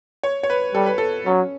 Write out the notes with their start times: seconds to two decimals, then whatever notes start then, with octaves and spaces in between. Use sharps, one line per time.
0.23 C#5
0.43 C#5
0.50 B4
0.74 G3 A4
0.86 B4
0.98 A4
1.25 F#3 C#4